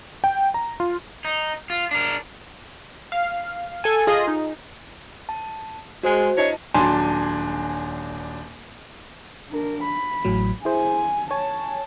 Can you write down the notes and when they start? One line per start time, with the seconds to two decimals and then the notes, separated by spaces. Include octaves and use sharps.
0.24 G5
0.54 A#5
0.80 F4
1.25 D#4
1.70 F4
1.91 D4 A#4
3.12 F5
3.84 A4 G#5
4.07 F4 G#4 D#5 D#6
4.28 D#4
5.29 A5
6.03 G#3 F#4 C5
6.38 D4 E4 C#5 D#5 A5
6.74 D#1 F#3 D4 G#5 A5 C6
9.51 D4 A#4
9.84 B5
10.24 A1 A2 F#3
10.65 E4 G#4 C5 G#5
11.31 C#5 G#5 A5